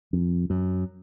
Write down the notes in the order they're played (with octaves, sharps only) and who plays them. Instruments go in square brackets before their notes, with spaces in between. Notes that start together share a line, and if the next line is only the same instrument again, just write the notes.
[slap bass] F2
F#2